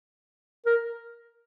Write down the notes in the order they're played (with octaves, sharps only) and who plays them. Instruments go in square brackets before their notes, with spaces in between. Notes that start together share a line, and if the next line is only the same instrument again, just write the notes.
[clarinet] A#4